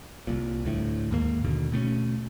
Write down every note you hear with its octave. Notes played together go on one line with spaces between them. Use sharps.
C2 A#2
D2 A2
D#2 G#2 A#3
D#2 B2 D3
B2 A3 C4 C#4